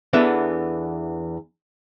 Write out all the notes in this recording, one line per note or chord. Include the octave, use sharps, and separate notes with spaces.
E2 E3 B3 D4 A4 E5